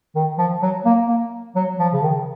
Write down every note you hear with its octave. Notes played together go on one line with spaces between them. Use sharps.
D#3
F3
F#3
A#3
A#3
F#3
F3
C#3
D#3